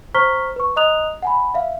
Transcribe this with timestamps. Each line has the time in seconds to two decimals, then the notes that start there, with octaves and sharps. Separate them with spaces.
0.15 C5 A#5 C#6 F6 B6 G7
0.56 B4 C#6
0.76 D#5 A#5 D#6 F#6 F7
1.22 F#5 G#5 B5
1.54 E5 F5